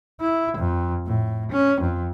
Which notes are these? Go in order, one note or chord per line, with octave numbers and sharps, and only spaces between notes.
E4
F2
A2
C#4
F2